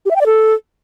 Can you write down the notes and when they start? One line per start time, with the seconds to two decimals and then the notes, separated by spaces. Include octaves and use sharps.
0.06 G4
0.11 E5
0.16 G5
0.21 D5
0.26 A4